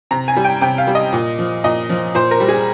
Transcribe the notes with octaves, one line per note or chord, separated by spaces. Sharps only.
C3 A#5
G#5
G3
G5
C3 G5
F5
G3
D#5
A#2
F3
A#2 D#5
F3
A#2 C5
A#4
G3
G#4